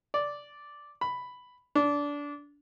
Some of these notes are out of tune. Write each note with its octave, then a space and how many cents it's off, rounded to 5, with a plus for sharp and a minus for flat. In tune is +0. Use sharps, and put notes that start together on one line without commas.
D5 -5
B5 +5
D4 -20